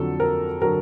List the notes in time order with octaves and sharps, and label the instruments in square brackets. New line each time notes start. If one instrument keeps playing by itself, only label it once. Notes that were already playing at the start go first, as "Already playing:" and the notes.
Already playing: [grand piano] F2 D3 F#3 A4
A#4
D3 F#3 A#4